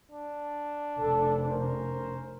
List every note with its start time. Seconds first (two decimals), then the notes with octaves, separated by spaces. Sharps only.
0.11 D4
1.00 F1 A4
1.48 C#4 A#4 C5